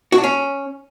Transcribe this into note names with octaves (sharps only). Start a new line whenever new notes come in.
F#4
D4
C#4